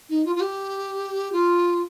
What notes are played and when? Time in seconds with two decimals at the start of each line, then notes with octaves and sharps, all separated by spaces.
0.09 D#4
0.25 F4
0.36 F4
0.41 G4
1.32 F4